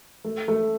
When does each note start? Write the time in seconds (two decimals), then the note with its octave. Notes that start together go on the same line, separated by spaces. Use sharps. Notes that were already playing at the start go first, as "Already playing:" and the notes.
0.24 A3
0.48 A3